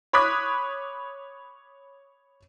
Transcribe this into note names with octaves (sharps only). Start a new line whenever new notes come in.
C#5 B5 D6 D#6 F#6 B6